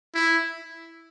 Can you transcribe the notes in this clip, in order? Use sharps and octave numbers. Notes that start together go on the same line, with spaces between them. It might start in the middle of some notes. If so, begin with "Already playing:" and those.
E4